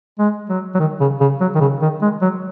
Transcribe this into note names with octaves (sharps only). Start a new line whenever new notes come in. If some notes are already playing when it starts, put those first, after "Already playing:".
G#3
F#3
F#3
D#3
C#3
C#3
F#3
D#3
C#3
D#3
G#3
F#3